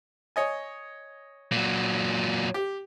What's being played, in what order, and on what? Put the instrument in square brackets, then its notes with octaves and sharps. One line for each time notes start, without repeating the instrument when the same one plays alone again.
[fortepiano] C#5 D#5 G#5
[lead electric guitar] A#2 F#3
[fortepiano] G4